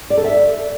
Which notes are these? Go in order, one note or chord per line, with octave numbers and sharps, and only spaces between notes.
D5
A4
E5